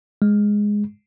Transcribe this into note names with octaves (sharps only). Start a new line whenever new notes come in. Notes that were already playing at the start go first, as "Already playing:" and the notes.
G#3